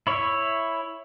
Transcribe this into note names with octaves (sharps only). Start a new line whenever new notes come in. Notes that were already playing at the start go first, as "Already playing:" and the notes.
E4 C#5 E5